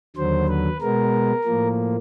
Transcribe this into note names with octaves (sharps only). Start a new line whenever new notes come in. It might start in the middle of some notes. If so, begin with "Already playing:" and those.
D#2 D3 F#3 C5
B4
B2 G#3 B3 A#4
A2 F3 A#3